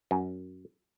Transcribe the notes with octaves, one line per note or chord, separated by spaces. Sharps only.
F#2